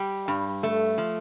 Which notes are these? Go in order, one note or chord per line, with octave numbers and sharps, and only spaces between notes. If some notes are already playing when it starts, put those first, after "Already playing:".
Already playing: G3 G4
G2
A3
F3